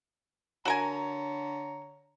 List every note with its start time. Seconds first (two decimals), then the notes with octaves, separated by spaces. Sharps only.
0.65 D3 F#4 A#4 C#5 G#5 A#5